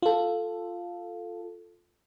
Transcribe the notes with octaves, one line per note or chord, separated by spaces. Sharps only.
F4 A4